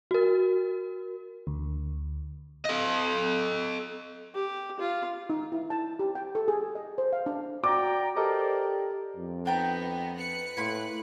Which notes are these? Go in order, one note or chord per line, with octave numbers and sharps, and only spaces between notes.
F#4 A#4
D2
A4 D#5
G4
F4
D#4
E4
A5
G4
G5
A4
G#4
D#5
C5
F5
D4
F#4 D5 G5 A#5 D6
G4 A4 A#4 C5 D5 D#5 A#5
F2
B3 D4 D#4 G5 A#5
B4 F#6 C#7
A2 A#3 B5 C6